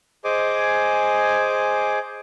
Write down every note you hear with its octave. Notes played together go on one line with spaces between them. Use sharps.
G#4 C5 D#5 G#5 D6